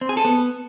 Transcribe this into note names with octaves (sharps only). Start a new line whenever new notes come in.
C4
G#4
A4
B3